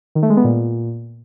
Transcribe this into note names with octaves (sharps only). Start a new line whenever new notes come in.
D#3
A3
G#3
B3
A#2